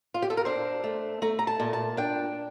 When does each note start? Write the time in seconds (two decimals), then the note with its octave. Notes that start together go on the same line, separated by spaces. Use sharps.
0.14 F4
0.22 G4
0.30 A4
0.37 A#4
0.45 D4 C5
0.84 A3
1.22 A3 A#5
1.39 A#5
1.47 A5
1.60 A#2
1.73 A5
1.97 D4 G5